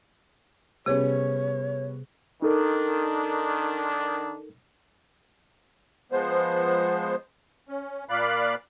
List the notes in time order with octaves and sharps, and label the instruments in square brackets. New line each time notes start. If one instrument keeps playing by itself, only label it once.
[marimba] C3 G#4 [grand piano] G3 B3 C#4 [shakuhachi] C#5
[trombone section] D#3 D4 [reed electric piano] D#4 A4 A#4
[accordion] F3 G#3 B3 C5
C#4
A#2 D5 F5 B5 F#6